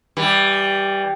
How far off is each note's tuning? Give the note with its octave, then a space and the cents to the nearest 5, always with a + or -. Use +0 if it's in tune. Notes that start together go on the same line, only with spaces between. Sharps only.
E3 -15 G3 +0